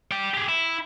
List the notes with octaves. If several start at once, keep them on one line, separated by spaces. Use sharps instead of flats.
D5 G5
G4 G#4
E4